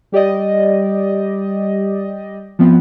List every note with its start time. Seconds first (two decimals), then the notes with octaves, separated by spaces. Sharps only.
0.12 G3 G4 D5 D#5
2.59 F3 B3 C4